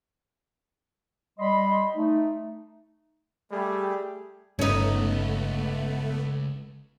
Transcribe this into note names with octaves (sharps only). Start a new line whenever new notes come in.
G3 D#5 B5 C6
A3 D#4
G3 A3 G4 G#4
G1 C#2 G2 A3 B3 C#4 D#4 D#5